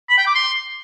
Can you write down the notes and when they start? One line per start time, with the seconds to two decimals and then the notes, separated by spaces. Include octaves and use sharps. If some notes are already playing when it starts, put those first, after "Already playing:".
0.09 B5
0.18 G5
0.26 D6
0.35 C6